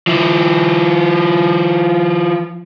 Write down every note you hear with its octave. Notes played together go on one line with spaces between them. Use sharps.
F3 E4